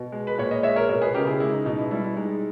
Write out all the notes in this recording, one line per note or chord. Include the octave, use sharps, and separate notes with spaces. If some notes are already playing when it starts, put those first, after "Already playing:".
Already playing: B2
G#3
B4
A#2 C#5
D#5
G#3 C#5 E5
A#4 C#5
B2 A#4 C#5
G#4 B4
C#3 G4 A#4
E4 G#4
G#3 E4
D#4
B2 D#4
E4
G3 E4
E4
G#3 D#4